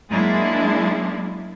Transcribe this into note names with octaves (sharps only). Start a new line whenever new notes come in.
F#3 G#3 A#3 D4 E4